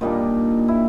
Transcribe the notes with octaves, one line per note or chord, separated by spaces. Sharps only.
A#2 G3 A#3 D4 D#4
E4